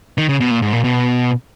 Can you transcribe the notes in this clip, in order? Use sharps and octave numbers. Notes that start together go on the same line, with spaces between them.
D#3
C#3
B2
A#2
G#2
A#2
B2